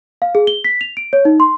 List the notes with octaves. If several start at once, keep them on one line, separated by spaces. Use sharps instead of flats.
F5
G#4
G7
B6
F7
D7
C#5
D#4
C6